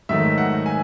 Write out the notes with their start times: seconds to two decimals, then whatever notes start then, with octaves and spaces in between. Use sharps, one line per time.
0.09 G#2 D#3 F#3 A3 D#4 E5
0.38 F#5
0.66 G#5